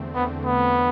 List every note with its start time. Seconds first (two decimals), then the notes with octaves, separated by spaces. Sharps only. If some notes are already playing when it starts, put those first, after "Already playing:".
Already playing: E2 D3 A3 C4
0.15 E2 D3 A3 B3 C4
0.46 B3